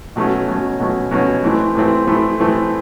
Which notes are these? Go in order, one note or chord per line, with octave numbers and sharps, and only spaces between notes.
B2 F#3 A3 C#4
B2 F#3 A3 C#4
B2 F#3 A3 C#4
B2 F#3 A3 C#4
A2 E3 A3 C4
A2 E3 A3 C4
A2 E3 A3 C4
A2 E3 A3 C4